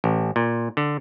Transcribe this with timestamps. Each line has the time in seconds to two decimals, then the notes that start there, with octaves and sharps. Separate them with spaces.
0.04 A1
0.36 A#2
0.77 D3